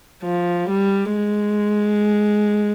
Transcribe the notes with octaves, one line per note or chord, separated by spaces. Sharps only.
F3
G3
G#3